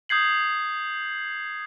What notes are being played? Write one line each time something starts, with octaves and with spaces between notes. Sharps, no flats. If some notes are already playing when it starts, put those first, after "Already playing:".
D#6 G6 G#6 C7 F#7